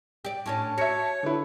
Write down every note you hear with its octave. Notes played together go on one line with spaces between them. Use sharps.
G4 D5
A2 C#4 D4 A5
F#4 C#5 E5 C#7
D3 E4 B4